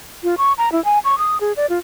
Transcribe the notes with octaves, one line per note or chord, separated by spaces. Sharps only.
F4
C#6
A#5
E4
G#5
C#6
D#6
G#4
D5
F4